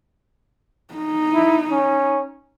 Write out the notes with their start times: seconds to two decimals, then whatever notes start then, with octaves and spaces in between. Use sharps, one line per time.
0.94 D#4
1.34 E4
1.71 C#4